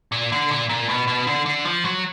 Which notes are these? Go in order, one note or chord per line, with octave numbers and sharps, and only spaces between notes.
A#2
D3
A#2
A#2
B2
B2
D3
D3
F3
F#3